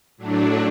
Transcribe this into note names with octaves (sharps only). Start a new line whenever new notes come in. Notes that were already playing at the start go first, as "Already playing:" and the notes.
A2 F#3 A3 D4